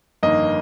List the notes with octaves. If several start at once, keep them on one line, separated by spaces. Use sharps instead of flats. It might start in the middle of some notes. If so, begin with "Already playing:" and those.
G1 F2 D#3 A#3 D#5